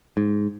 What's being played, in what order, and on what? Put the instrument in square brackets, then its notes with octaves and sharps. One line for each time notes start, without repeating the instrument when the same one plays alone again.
[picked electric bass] G#2